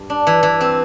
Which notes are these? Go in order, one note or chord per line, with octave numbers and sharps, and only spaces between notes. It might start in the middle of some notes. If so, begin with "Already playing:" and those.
Already playing: G2
D4
E3
E3
C4